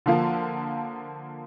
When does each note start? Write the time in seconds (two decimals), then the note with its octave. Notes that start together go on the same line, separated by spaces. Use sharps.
0.06 D3 F3 A#3